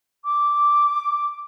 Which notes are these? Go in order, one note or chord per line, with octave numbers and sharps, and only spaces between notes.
D6